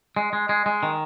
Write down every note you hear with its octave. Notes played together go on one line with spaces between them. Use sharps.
G#3
G#3
G#3
G#3
D#3